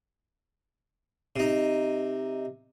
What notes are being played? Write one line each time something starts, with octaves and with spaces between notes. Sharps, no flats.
C3 D#4